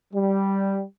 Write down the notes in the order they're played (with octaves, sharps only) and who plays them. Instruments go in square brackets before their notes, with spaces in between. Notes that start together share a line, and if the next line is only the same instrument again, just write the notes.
[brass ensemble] G3